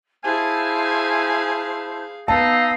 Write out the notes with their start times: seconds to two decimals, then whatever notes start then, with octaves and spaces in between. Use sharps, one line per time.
0.24 E4 G#4 C5 F5 G#5 A5
2.28 B3 D#4 F5 A5 E6